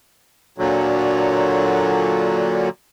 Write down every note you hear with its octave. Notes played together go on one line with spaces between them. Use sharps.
A#2 D3 F#3